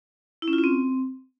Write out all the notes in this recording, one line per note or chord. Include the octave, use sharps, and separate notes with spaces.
E4
C#4
F4
C#4
C4